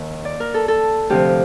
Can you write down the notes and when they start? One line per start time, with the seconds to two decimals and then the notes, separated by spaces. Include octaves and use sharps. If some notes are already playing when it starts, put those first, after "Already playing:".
Already playing: D#2 D#3 D#5
0.25 D5
0.40 A#4
0.54 A4
0.68 A4
1.10 D2 C3 F3 G4